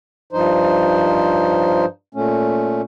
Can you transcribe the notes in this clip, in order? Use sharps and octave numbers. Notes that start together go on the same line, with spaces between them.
G2 F3 D#4 C5
A#2 A3 C#4